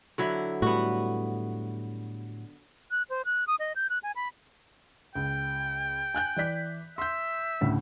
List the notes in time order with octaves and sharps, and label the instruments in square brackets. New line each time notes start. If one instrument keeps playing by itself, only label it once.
[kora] D3 F#3 E4
[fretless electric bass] A2 G3 [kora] B3 F#4
[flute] F#6
C5
F#6
D#6
D#5
G6
F#6
G#5
B5
[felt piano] C#2 [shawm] G5
[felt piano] G#5 F#6 G6
E3 D5 B6
[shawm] E5 [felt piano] C6 G6
[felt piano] D2 A2 C#3